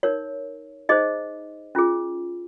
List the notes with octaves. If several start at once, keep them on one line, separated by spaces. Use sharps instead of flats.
D#4 A#4 C#5
D#4 G#4 C5 D#5
C#4 F4 G#4